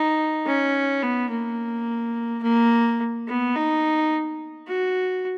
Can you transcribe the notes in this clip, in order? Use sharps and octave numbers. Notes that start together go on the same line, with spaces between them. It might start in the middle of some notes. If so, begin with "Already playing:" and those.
Already playing: D#4
C#4
B3
A#3
A#3
B3
D#4
F#4